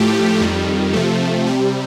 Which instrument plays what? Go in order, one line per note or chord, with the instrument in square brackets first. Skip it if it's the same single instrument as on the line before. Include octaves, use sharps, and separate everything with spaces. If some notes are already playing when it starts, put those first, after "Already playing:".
Already playing: [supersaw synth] A2 F3 A3 G4
F2 D#3 G3
C3 F3 A3
C3 G3